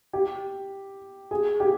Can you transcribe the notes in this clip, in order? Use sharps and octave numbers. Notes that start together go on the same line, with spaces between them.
G4
G#4
G4